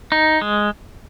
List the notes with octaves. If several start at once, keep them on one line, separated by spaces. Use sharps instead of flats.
D#4
G#3